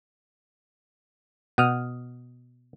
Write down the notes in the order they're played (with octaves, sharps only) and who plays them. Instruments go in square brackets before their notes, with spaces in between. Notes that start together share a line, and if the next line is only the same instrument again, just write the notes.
[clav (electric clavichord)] B2 [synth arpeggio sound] F#5 D#6 F6